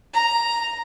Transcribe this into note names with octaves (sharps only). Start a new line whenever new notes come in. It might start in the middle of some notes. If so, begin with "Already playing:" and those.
A#5